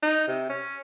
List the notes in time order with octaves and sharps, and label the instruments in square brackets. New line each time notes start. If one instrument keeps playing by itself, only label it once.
[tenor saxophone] D#4
C3
C#4